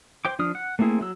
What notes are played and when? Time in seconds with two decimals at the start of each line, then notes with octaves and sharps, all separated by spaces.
0.25 C5 G5 D6
0.39 F3 D4 D#6 F6
0.55 F#5
0.79 A3 A#3 C4 E4 G#4
1.01 F#3 E6